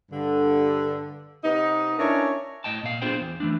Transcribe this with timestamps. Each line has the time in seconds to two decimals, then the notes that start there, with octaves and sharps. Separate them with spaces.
0.11 G2 D3
1.44 C3 B3 D#4
1.99 C#4 D4 E4 A#4 C#5
2.64 A2 D#5 G5 A5
2.83 A#2 F5
3.02 B3 D4 F4 G#4 C5 G5
3.21 E2
3.40 E3 A3 D4